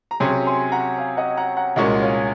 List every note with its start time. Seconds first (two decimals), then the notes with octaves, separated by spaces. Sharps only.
0.11 A#5
0.20 C3 F#3 C#4 G#4 G#5 C6
0.46 G#5 C6
0.72 F#5 A#5
0.98 F5 G#5
1.17 D#5 F#5
1.37 F#5 A#5
1.57 F#5 A#5
1.76 C2 A#2 G#3 C#4 F#4 D#5 F#5
2.02 C#5 F5